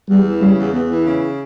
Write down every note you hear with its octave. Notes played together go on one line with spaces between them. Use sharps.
E2 G3
E3
C#3 G3
E2
E2 B3
E3
C#3